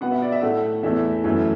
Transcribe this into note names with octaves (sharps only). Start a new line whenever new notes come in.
B2 B3 F#5
E5
D5
E5
A2 A3 F#5
E2 E3 A3 E5
F#2 E3 A3 E5